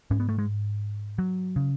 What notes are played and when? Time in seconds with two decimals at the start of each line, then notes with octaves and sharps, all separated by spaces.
0.11 G#2 C#4
0.20 B3
0.29 A3
0.38 G#3
1.18 F#3
1.56 C#3